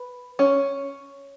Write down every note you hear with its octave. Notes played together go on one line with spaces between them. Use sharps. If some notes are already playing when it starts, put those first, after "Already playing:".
Already playing: B4
C#4